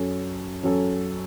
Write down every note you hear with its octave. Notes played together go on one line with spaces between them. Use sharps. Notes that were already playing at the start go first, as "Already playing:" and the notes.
Already playing: F#2 F#3 C#4 A4
F#2 F#3 C#4 A4